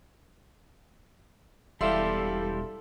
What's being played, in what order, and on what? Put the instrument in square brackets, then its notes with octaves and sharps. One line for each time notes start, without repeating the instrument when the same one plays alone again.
[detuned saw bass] E1 [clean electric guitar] G3 E4 G4 [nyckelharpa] A4 [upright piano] E5 F5 C6